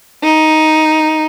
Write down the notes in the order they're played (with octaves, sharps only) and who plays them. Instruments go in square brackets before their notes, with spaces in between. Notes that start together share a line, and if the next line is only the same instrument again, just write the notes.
[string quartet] D#4